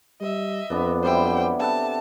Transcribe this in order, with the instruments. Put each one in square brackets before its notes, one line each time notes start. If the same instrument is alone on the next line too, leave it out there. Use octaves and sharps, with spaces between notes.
[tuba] G3 [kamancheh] D#5 E5
[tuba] F2 [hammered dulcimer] B3 D4
[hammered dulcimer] F#3 G3 E4 [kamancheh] C5 G5
[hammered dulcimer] C3 A4 F#5 [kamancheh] A5